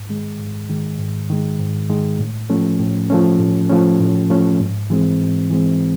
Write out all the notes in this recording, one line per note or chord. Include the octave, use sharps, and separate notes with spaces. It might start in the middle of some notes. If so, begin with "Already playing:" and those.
Already playing: G#2
D#3 G#3
G#2
D#3 G#3
G#2
D#3 G#3
G#2
D#3 G#3
A2
F3 A3 C#4
A2
F3 A3 C#4
A2
F3 A3 C#4
A2
F3 A3 C#4
G#2
E3 G#3 C4
G#2
E3 G#3 C4